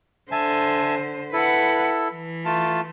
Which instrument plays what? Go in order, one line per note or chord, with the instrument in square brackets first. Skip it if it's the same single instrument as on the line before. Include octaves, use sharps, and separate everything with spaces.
[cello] D3 C5 [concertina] E5 G#5 A5
[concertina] E4 A4 [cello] B4 F#5
[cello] E3
[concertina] A3 F4 A5